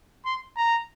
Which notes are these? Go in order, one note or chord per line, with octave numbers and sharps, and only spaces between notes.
C6
A#5